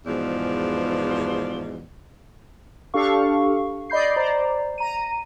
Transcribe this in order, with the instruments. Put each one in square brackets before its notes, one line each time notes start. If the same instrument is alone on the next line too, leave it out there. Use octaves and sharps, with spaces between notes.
[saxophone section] E2 G#2 B2 F3 D5
[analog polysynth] D4 G4 A4 F5 C#6
D5 D#5 B5 G6 C7
C5 D5 A#5
A#5 D#7